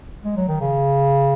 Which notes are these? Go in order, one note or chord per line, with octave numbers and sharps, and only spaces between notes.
G#3
F#3
D#3
C#3